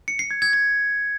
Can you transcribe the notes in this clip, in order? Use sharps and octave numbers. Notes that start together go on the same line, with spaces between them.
C#7
C7
G#6
G#6
G#6